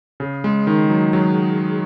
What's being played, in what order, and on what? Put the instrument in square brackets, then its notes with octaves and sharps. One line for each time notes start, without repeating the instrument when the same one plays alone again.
[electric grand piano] C#3 [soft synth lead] G#4
[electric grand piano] G#3
D#3
F#3
F#3